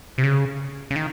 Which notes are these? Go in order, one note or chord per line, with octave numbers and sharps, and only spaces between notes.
C3
C#3
C#3
D#3